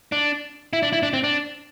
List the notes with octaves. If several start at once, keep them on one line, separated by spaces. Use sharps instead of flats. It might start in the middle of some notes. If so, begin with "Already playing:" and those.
D4
E4
D4
E4
D4
C4
D4